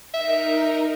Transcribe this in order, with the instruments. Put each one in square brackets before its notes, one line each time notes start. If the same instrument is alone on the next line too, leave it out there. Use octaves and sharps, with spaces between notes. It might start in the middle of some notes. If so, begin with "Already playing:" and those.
[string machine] D#4 A#4 [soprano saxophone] E5